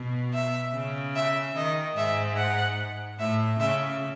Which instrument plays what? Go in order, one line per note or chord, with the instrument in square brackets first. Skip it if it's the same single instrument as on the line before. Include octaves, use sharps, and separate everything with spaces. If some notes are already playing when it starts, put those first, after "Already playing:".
Already playing: [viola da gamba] B2
[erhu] E5
[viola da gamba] C#3
[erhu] E5
[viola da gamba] D#3 [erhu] D#5
[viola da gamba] G#2 [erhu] E5
[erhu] F#5
[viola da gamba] A2 [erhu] E5
[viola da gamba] C#3 [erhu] E5